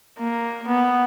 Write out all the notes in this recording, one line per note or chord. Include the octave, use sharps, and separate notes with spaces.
A#3
B3